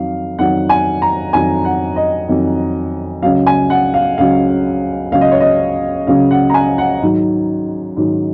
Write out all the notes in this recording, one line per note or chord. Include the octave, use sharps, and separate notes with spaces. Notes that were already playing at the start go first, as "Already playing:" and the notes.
Already playing: F2 D#3 F#3 F5
F2 D#3 F#3 F#5
G#5
A#5
F2 D#3 F#3 G#5
F#5
D#5
F2 D#3 F#3
C#2 C#3 F#3 F5
G#5
F#5
F5
C#2 C#3 F#3 F5
C#2 C#3 F#3 F5
D#5
C#5
D#5
C#2 C#3 F#3 F5
F#5
A#5
G#5
F#5
G#2 D#3 F#3
G#2 D#3 F#3